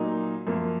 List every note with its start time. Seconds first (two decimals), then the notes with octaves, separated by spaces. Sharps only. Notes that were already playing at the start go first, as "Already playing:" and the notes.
Already playing: A#2 F#3 A#3 D#4
0.47 F#2 F3 A#3